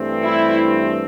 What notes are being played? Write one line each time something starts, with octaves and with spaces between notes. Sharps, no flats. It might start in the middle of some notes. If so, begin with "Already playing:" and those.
Already playing: G2 E3 A3 C4
E4